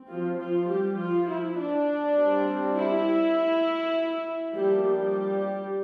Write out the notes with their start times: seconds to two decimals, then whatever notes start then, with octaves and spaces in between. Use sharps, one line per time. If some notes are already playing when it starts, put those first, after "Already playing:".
Already playing: C4
0.09 F3 F4
0.39 F3 F4
0.69 G3 G4
0.98 F3 F4
1.29 E4
1.58 D4
2.17 G3 C4
2.76 E4
4.53 F3 G3 A#3 D4 G4
4.83 G3 G4